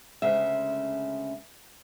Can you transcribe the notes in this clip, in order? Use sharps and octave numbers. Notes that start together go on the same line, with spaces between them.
D2 C#3 G#3 E5